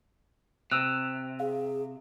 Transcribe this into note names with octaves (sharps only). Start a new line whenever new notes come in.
C3 E6 F#6
G#4 F5